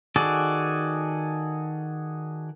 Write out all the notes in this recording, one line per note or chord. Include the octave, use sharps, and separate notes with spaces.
D#3 F#4 G#4 A4 D5